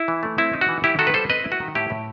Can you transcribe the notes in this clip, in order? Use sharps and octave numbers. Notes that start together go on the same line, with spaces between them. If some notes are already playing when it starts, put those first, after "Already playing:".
Already playing: E4
E3
A3
C4 E4
D#4
F#4
E3
E4 G4
D#3 F#4 A4
B4
G3 A4 C5
C4 B4 D#5
E4
F#4
D#3
A2 E4 G4
A2